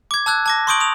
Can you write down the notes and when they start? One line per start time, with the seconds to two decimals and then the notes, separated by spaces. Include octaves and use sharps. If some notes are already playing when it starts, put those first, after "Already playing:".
0.11 D6 G#6
0.26 A5 E6 F#6 G#6
0.46 A5 D6 A#6
0.67 C6 C#6 D#6 G6 D7 F#7
0.80 D#6 F7